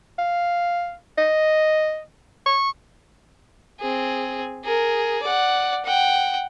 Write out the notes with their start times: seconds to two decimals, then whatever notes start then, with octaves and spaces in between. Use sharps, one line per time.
0.18 F5
1.18 D#5
2.46 C#6
3.80 C4 G#4
4.64 G#4 A#4
5.22 D5 F#5
5.85 F#5 G5